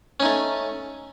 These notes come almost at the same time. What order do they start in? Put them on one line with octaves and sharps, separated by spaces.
C#4 D#4 A3